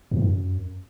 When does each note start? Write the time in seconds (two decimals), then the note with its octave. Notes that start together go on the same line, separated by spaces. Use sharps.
0.11 F2
0.17 G#2
0.22 F#2